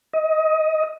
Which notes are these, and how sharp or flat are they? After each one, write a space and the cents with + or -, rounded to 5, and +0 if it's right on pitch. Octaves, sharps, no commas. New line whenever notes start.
D#5 +20